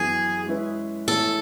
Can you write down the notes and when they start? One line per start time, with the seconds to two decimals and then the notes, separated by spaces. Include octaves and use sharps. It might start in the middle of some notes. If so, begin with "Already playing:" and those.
Already playing: F#2 E3 B3 G#4
0.46 G#3 C#4 E4 B4
1.08 E3 A3 E4 G#4 A4 C#5